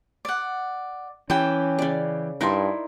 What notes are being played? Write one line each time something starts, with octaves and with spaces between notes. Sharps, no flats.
D5 F#5
E3 C#4 G4 G5 A5
C#3 D5
G2 D#4 E4 A#4 D5 C6